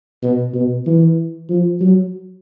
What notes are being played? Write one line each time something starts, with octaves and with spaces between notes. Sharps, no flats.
B2
B2
E3
F3
F#3